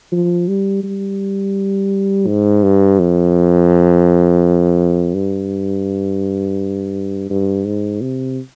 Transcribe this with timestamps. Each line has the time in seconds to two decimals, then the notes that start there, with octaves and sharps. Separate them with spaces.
0.12 F3
0.48 G3
0.84 G3
2.27 G#2
2.63 G2
2.99 F2
5.14 G2
7.30 G2
7.65 G#2
8.01 C3